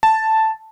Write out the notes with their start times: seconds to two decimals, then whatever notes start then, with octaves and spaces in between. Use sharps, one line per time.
0.03 A5